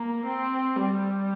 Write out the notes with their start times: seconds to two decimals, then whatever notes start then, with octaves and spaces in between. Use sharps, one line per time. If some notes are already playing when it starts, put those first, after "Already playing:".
Already playing: A#3
0.26 C4
0.76 G3